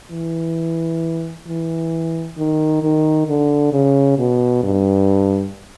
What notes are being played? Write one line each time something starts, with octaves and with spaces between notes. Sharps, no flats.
E3
E3
D#3
D#3
D3
C#3
B2
G2